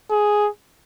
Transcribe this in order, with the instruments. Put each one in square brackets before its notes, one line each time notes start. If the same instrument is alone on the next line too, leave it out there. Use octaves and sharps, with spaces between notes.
[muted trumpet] G#4